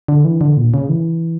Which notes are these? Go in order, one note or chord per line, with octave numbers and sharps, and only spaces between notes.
D3
E3
D3
A#2
C#3
E3